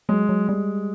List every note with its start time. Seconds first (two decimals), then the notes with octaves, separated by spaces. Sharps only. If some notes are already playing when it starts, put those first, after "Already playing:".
0.09 F#3 G#3
0.29 F#3
0.48 G3 G#3